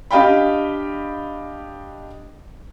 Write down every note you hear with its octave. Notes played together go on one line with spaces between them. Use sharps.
D4 G4 D#5 F5 G5 B5